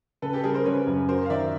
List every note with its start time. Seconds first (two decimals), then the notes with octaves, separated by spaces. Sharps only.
0.22 C#3 A4 B4
0.33 G4 A4
0.44 G3 G#4 A#4
0.54 A#4 C5
0.65 C#3 B4 C#5
0.87 F#2
1.08 F#3 A#4 C5
1.26 F5
1.30 D#3 D5 E5